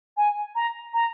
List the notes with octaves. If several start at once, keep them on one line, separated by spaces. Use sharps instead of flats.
G#5
A#5
A#5